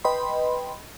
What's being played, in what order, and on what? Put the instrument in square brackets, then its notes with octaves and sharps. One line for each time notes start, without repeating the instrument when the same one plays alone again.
[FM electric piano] B4 D#5 G5 B5 C6